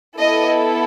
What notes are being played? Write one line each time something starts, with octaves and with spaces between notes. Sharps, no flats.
B3 E4 A4 D#5